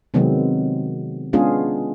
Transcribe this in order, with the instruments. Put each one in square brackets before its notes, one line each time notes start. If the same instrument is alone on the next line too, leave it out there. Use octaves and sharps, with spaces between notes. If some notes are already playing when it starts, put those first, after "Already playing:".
[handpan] C3 D#3 F#3 G#3 B3 C4
G#3 B3 C#4 D4 F4 G#4